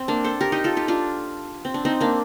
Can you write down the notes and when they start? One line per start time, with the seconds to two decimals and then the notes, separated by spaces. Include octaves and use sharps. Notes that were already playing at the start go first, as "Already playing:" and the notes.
Already playing: C4
0.08 A#3 D4
0.24 A4 C5
0.41 G4 A#4
0.52 D#4 G4
0.64 F4 A4
0.77 D#4 G4
0.88 D4 F4
1.65 C4
1.74 D4
1.85 C4 D#4
2.01 A#3 D4